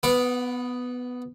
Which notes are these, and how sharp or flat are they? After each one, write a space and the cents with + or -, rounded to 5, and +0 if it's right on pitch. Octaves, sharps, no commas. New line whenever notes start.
B3 +5 F#5 -35 D6 +0